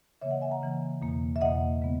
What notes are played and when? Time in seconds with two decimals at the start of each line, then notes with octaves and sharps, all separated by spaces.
0.21 C#3 E3 A#3 C#5 E5
0.31 D#5 F#5
0.41 E5 G#5
0.51 F#5 A#5
0.62 C#3 E3 A#3
1.01 E2 B2 A#3
1.36 E5
1.41 E2 B2 A#3 D#5 F#5
1.82 C#3 G#3 B3